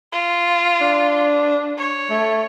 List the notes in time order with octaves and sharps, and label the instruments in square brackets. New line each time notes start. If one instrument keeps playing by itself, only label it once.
[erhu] F4
[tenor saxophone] D4
[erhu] C#5
[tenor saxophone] A3